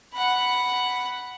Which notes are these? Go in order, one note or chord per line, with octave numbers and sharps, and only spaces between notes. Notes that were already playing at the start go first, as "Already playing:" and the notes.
F#5 B5